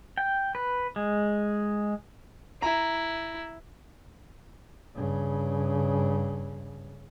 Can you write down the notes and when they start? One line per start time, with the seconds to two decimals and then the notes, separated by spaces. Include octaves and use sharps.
0.18 G5
0.55 B4
0.96 G#3
2.62 E4 A#5
4.95 G2 C#3